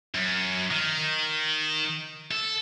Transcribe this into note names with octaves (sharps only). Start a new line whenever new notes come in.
F#2
D#3
A4